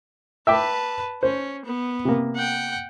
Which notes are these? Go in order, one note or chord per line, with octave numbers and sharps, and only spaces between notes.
B4 E5 G5 A5 D6
C#4 C5
B3
C3 A#3
F#5 G5